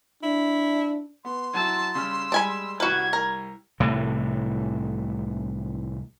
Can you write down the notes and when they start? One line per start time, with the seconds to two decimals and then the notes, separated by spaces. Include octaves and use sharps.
0.23 D4 E4
1.25 B3 C6
1.54 F#3 E4 A5 E6
1.95 C#3 G3 E6 F6
2.32 G3 G#3 D4 G#5 B5
2.80 C2 G3 F#4 B4 F6 G#6
3.13 A#4
3.80 C2 A2 C3 E3